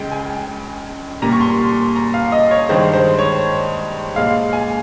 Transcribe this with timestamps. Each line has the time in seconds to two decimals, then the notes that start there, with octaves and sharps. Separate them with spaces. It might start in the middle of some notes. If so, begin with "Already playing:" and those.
Already playing: C#2 C#3 G#3 G5
0.12 G#5
1.22 A#2 G3 A#3 A#5
1.33 C#6
1.41 C6
1.58 C6
1.96 A#5
2.14 F5
2.32 D#5
2.51 C#5
2.69 G2 D#3 G#3 C5
2.94 C5
3.19 C#5
4.16 A#2 G#3 F5
4.53 G#5